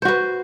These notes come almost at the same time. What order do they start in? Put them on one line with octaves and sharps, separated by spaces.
C5 F#4 B4